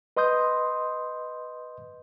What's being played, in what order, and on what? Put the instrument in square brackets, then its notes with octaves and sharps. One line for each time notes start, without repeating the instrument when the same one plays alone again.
[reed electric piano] B4 D#5 C6 D#6 G6